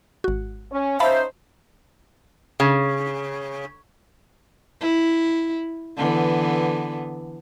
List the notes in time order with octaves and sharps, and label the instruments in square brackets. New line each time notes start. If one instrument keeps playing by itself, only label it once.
[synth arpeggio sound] G#1 F#4
[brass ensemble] C#4
[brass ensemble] C#4 D#4 C5 [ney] E5 [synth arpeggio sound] F5 A5 B5
[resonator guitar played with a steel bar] C#3
[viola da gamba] E4
D3 E3 B3